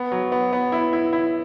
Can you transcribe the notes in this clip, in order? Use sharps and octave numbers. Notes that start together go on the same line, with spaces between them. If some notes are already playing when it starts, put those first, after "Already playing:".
Already playing: B3
F#3
B3
B3
E4
E4
E4